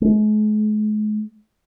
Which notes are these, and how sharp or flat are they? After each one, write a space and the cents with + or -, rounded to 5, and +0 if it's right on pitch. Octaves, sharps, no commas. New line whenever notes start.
G#3 +45